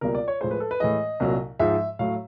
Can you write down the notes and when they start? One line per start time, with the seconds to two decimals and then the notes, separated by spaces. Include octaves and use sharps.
0.01 C#2 B2 G3 A#3 A#4
0.15 D5
0.28 C#5
0.41 A2 F3 G#3 C5
0.51 B4
0.60 A4
0.71 B4
0.80 A2 E3 G#3 D#5
1.20 C2 A#2 F#3
1.59 G#2 F3 G#3 E5
1.99 A2 F#3 A3 F5